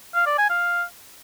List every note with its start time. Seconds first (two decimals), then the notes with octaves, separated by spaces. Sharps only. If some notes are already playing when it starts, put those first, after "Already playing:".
0.15 F5
0.26 D5
0.38 G#5
0.50 F5